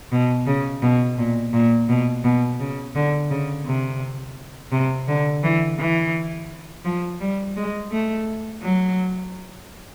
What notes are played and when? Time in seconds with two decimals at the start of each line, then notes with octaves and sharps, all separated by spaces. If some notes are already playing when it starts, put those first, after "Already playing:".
0.12 B2
0.46 C#3
0.82 B2
1.18 A#2
1.53 A#2
1.89 B2
2.24 B2
2.60 C#3
2.95 D3
3.30 C#3
3.66 C3
4.72 C3
5.08 D3
5.43 E3
5.78 E3
6.84 F3
7.20 G3
7.56 G#3
7.92 A3
8.62 F#3